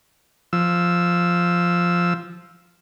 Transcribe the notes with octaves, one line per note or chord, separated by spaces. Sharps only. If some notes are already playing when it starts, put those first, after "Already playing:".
F3 E6